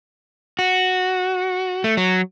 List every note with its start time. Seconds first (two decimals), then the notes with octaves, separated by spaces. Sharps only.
0.59 F#4
1.84 A3
1.97 F#3